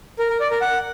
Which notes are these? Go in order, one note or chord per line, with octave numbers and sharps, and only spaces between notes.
A#4
A#4
D5
A#4
F#5